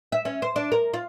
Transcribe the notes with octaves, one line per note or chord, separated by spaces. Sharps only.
E5
C#4
C5
D4
A#4
F4